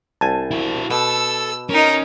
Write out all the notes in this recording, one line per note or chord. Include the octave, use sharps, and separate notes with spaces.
C2 G#5 A5
E4 F#4
B2 A4 E6
C#4 D#4 A#4